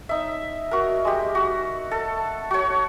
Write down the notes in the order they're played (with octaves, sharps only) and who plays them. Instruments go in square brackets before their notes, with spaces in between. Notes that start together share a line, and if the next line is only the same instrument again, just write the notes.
[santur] D#4 E5
F#4 A#4
G#3 G4
F#4
A4
F#4 C#5